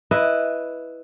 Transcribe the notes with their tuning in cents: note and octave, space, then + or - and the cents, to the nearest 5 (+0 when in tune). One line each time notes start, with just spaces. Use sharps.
E4 +0 B4 +0 D#5 +0